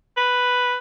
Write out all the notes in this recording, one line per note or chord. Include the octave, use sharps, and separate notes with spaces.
B4